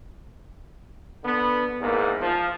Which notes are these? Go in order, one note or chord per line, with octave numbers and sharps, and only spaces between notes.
D3 B3
E2 G#2 A#3
F3